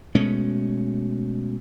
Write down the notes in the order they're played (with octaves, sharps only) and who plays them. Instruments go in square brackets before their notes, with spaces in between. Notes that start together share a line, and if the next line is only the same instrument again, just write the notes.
[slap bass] B2 G#3 A3 C#4